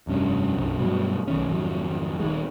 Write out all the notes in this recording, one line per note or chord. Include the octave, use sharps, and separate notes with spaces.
F1 G2 C#4
B1 F#2 D3
G2 B2 F#3
B1 D#3 C#4
G#1 F2 F#3
D#1 D#3 G#3